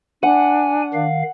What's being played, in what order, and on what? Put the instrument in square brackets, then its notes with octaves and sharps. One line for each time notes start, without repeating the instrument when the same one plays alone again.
[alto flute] D4 [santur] F#5 [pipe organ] G#5
[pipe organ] D#3 F5